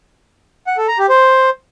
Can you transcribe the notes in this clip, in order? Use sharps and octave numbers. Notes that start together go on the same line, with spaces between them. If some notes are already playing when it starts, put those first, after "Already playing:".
F#5
A4
A#5
G4
C5